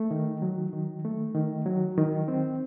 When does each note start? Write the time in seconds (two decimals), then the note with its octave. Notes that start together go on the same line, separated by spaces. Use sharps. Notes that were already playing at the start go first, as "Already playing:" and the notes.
Already playing: A3
0.11 D#3
0.42 F#3
0.73 D#3
1.05 A3
1.35 D#3
1.66 F#3
1.97 D#3
2.28 C4